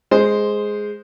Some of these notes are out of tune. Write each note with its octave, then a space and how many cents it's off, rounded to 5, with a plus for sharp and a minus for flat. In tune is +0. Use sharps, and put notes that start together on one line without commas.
G#3 +0 C5 +0